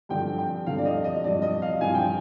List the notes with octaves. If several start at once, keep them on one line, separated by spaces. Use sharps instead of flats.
G2 D3 F3 G5
G5
G2 D3 F3 F5
D5
D#5
D#5
G2 F3 D5
D#5
F5
G2 F3 G#5
G5